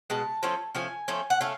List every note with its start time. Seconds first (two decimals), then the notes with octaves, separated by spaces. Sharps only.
0.10 B2 G#3 A5
0.43 F3 A3 C#4
0.75 F3 A3 C#4 G#5
1.08 F3 A3 C#4
1.30 F#5
1.41 A3 C#4 F5